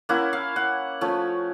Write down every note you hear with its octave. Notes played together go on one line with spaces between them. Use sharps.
A#3 C#4 E4 F#5
F5
F#5
F3 A3 C#4